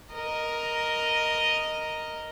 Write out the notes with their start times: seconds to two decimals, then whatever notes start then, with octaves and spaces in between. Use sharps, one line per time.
0.13 A#4 D#5